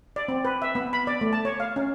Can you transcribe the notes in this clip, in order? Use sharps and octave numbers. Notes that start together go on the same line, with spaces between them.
D5
C4
B4
E5
B3
B5
D5
A3
A5
C#5
F5
C#4